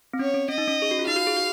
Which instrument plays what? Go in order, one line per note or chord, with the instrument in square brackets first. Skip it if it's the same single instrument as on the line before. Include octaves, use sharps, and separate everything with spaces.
[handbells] C4
[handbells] C#4 [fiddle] C#5
[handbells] C#4
[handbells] C#4 [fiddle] D#5
[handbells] D#4
C#4
G#4
F#4
F4
[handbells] D#4 [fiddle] F5
[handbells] F#4
G#4
F#4